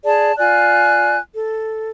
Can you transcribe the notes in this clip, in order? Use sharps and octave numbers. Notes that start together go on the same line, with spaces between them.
G#4 D5 A5
F4 D5 G#5 F#6
A4